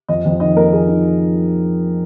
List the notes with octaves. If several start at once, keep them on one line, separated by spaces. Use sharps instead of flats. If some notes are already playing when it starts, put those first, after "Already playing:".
F2 D#5
F2
D#3 D#5
A#3 A#4
F2 G#4
D#4